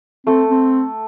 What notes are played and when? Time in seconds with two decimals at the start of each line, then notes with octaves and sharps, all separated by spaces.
0.27 A3 C4 A4
0.50 C4